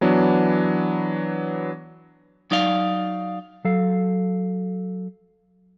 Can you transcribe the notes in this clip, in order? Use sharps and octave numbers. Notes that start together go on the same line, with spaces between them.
E3 F#3 B3 D4
F#3 D#4 D5 F5
F#3 A4 F5